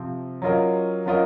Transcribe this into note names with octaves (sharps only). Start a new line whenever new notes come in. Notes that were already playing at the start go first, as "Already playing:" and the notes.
Already playing: C3 F3 C4
F#3 C#4 F4 A#4 D#5
F#3 C#4 F4 A#4 D#5